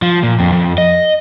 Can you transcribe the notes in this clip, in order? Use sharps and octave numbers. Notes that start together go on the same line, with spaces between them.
F3
A#2
F2
F2
D#5